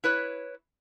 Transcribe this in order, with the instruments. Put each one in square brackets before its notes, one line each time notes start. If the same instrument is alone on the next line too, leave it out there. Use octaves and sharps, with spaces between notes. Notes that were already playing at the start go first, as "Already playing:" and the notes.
[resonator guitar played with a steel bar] E4 B4 C#5